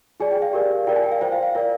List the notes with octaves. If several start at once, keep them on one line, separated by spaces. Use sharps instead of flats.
F4 G#4 D5 G#5
G5
F5
G4 A#4 D5
F4 A#4 D5 G5
G#5
G5
F5
F4 C5 G5
F5
F5
F4 A#4 D5